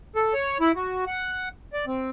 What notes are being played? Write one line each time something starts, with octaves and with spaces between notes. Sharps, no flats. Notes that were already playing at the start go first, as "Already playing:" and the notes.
A4
C#5
E4
F#4
F#5
D5
C4